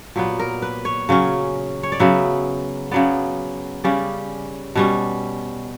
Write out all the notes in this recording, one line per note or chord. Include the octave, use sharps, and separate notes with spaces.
A#2 F#3 B3 G4
A#4
B4
C#5
C#3 F#3 C#4
C#5
D5
C#3 F#3 B3 E5
C#3 F#3 B3 D5
C#3 G3 C#4 D5
B2 G3 C#4